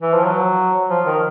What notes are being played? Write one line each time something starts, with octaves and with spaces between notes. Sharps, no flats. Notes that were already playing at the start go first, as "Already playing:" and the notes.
E3
F3
F#3
F3
D#3